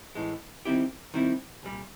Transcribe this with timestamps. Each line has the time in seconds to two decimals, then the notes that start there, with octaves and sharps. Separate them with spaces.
0.15 A2 E3 G#3
0.65 D#3 G3 C4 E4 G4
1.14 D#3 G3 C4 E4
1.63 C2 A#2 G3